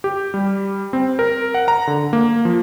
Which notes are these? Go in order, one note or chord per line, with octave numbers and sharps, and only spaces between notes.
G4
G3
C4
A#4
F#5
A#5
D3
A#3
F3